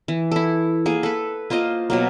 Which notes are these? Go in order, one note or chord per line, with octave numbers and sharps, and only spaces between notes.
E3
E4 A4
A#3 G#4
A4 B4
A#3 F4 C5 D#5
B2 F#3 A#3